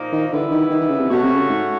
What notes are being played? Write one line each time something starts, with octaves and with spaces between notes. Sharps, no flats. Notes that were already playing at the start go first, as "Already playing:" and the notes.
Already playing: A#2 F3 A#3 D#4
D#3
D3 E3 G3 B3 E4
D#3
D#3
D#3
C#3
C3
B2 A3 C#4 F#4
C3
C#3
G#2